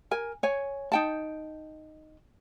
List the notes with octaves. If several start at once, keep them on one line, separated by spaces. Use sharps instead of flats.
A#4 G#5
C#5 G#5
D#4 G5 A5